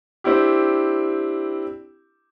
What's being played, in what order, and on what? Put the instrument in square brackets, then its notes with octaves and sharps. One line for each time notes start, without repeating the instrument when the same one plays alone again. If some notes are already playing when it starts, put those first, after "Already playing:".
[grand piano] C4 D4 E4 G4